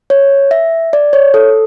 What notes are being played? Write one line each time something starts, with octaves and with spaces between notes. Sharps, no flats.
C#5
E5
D5
C#5
A4